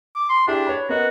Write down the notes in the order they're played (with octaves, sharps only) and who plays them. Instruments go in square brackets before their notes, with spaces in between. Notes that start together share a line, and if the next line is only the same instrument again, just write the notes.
[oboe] D6
C6
[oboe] D4 [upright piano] E4 G4 G#4
[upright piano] C#5 B5
[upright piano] B3 A#4 D#5 [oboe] F#4